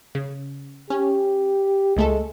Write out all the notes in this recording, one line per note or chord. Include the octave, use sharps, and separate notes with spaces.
C#3
C#4 G4
C#2 G#3 A3 A4